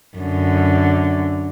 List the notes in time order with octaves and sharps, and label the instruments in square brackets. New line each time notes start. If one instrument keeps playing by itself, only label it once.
[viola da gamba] F#2 D3